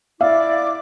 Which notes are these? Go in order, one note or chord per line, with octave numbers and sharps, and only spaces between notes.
E4 D5 E5 F5 D6